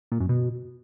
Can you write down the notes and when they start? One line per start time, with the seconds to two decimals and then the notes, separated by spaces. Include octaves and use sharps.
0.12 A#2
0.20 F#2
0.29 B2